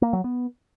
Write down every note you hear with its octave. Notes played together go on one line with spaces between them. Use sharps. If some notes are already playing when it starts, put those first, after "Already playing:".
A#3
F#3
B3